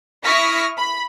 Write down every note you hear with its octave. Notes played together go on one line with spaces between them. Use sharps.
E4 C#6 D#6 F6 A#6 B6
B5